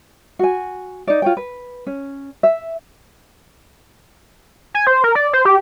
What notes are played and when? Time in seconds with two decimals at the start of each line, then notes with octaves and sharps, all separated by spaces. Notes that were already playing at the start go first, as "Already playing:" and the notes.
0.39 F#4 G#5
1.07 D#4 D5
1.22 F4 C#5 G5
1.37 B4
1.87 C#4
2.43 E5
4.74 G#5
4.87 C5
5.04 A#4
5.15 D5
5.33 C5
5.45 G4